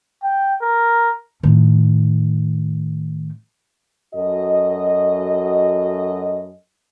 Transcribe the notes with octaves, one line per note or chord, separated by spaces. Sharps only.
G5
A#4
A2 D#3
F#2 F#4 A4 D#5